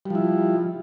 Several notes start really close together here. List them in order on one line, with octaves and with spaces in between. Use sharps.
G3 F3 E4